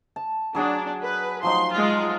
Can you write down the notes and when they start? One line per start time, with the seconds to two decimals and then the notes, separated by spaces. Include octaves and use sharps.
0.16 A5
0.55 F#3 D4 G#4 F#5
1.03 B4
1.43 F3 F#3 D#4 C6
1.75 G#3 F4